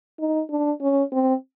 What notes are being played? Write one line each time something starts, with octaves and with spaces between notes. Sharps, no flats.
D#4
D4
C#4
C4